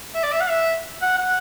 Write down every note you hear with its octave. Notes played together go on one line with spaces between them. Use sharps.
E5
D5
E5
F#5
E5
F#5
F#5